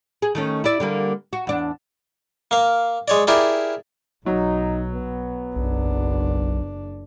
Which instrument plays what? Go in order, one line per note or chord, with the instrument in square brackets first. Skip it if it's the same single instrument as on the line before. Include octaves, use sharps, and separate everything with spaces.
[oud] G#4
D#3 A3 C#4
E4 D5
D3 G3 A#3
F#4
E2 D4
[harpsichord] A#3 F5
G#3 C#5 D5
E4 G4 G#4 A#4 D5
[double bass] B1 [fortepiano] F#3 [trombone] D#4
[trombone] B3
[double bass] F#1 D4 [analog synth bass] B1